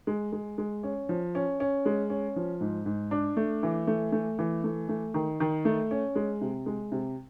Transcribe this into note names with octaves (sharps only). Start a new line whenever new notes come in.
G#3
G#3
G#3
C#4
F3
C#4
C#4
G#3
C#4
F3
G#2
G#2
D4
A3
E3
A3
A3
E3
A3
A3
D#3
D#3
A3
C#4
G#3
C3
G#3
C3